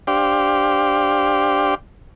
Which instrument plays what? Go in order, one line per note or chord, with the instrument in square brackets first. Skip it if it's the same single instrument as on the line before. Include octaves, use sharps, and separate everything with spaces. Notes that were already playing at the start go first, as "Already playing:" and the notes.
[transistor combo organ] D4 G4 C5 D5 F5 G5